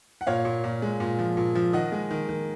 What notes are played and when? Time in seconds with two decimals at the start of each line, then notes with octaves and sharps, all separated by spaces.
0.21 F#5
0.27 A#2 C#5 F5
0.45 A#2
0.64 A#2
0.82 G#3
1.00 A#2
1.19 F3
1.37 A#2
1.55 F3
1.73 D#3 D#5 F#5
1.92 G#3
2.11 D#3
2.28 D#3